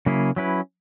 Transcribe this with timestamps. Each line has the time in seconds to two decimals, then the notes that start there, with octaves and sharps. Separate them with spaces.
0.06 C#3 F#3 A#3 E4 G#4
0.36 F#3 C#4 E4 B4